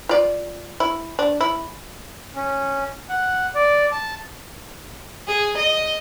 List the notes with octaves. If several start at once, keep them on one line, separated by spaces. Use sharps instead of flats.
F4 D5
E4
D4
E4
C#4
F#5
D5
A5
G#4
D#5